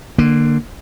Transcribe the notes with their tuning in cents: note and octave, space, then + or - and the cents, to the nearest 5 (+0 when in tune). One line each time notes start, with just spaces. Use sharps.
D3 +20 A#3 +0